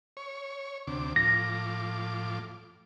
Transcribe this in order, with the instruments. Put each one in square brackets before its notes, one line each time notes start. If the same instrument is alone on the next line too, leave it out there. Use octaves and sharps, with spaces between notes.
[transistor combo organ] C#5
D2 C3 D6
[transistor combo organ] A2 F3 D6 [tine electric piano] A#6